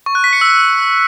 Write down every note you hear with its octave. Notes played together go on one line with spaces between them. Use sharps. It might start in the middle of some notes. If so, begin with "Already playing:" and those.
C#6
F#6
B6
C#7
E6